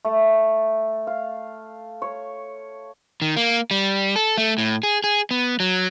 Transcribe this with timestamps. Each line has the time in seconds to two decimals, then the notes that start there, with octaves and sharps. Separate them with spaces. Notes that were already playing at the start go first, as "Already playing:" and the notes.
0.05 A3
1.07 F5
2.02 C#5
3.22 D#3
3.37 A#3
3.71 G3
4.16 A4
4.38 A3
4.58 A2
4.83 G#4
5.04 G#4
5.31 B3
5.60 F#3